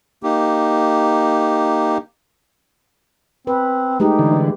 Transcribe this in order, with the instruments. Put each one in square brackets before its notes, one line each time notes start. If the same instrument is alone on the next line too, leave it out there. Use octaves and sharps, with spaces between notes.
[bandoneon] A#3 D#4 G4
[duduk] C4 [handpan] B4
[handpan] G#3 A3 G4 [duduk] D#4
[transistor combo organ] D3 E3